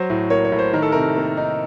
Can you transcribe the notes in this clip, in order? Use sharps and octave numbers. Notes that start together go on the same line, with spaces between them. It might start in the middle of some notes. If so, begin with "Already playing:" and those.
Already playing: F#3 C5
A2
A#3 C#5
C#5
A2
C5
D#3 A#4
A4
C3 A#4
A#3
D#4